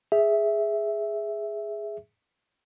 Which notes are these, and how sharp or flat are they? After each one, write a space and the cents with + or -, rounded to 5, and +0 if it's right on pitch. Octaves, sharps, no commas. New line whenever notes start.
G#4 +0 E5 +0